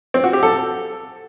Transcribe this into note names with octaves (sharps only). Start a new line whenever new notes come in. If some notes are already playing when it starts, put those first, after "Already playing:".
C4
F#4
G4
A4